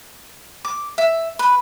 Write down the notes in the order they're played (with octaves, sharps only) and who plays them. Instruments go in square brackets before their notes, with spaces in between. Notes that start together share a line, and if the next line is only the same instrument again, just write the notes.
[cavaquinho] D6
E5
B4